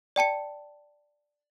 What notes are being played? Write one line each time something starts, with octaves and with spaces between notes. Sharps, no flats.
D5 G5 A5 C#7